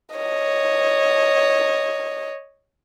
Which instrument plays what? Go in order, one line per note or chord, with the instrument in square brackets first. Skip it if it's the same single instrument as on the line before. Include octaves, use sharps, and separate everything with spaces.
[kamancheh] C#5 D#5